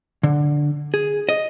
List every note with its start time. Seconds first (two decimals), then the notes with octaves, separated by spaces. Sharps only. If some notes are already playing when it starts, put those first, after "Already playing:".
0.23 D3
0.94 G#4
1.29 D#5